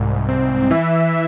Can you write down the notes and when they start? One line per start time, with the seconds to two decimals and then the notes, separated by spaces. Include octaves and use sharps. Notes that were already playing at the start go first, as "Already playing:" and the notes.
Already playing: C2 G#2
0.29 C4
0.70 E3 E5